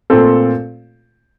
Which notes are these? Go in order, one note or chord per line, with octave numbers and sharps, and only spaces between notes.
A#2 A3 C4 F4 A4